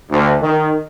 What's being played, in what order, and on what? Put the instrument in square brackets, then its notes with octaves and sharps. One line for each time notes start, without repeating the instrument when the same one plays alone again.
[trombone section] D2
D#3